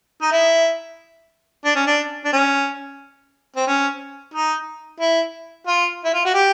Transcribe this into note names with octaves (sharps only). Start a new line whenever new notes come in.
D#4
E4
D4
C#4
D4
D4
C#4
C4
C#4
D#4
E4
F4
E4
F4
F#4
G4